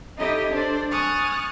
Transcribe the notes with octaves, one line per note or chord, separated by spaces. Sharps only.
D#4 E4 G4 A4 C#5 D#5
D4 A4 C5 D5
G#5 C#6 D#6 F6 F#6 A6